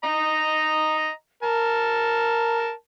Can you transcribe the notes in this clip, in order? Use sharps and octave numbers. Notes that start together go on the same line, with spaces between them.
D#5 A#5
A#4 A5